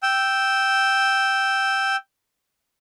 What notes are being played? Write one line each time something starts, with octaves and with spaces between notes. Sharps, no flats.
G5 E6